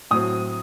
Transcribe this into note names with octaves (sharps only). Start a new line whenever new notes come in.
A2 F#3 C4 D#6